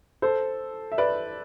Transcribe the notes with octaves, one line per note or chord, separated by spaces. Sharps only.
A4 C5
E5
B4 D5